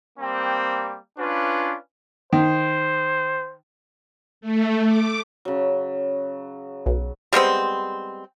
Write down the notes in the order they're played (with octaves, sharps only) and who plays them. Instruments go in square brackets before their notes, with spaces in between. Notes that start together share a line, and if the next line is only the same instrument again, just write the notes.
[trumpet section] G3 A#3 C4 G5
C#4 D4 F4 B4
[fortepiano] D#3 [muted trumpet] C5
[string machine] A3
D6
[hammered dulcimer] C#3 F#3
[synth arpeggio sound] B1
[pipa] G3 G#3 B3 C4